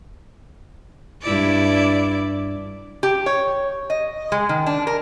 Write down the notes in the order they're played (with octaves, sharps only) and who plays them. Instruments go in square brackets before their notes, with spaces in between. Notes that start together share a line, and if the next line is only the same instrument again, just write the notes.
[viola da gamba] G2 E4 D5
[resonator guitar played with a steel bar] G4
C#5
D#5
G#3
D#3
D4
A#4